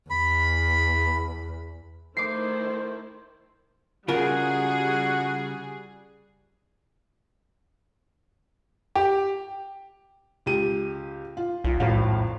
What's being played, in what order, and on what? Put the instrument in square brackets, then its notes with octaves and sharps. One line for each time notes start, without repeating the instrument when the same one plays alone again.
[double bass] E2 [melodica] B5
[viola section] D#3 A3 E4 [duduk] C5 [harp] D6 C7
[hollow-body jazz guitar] C#3 F4 A#4 [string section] G3 G#4 [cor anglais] F#4
[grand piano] G4
[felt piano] C#2 G4 D#7
F4
[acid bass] B1 [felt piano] F4
[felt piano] G#1 F2 F5 [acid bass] A2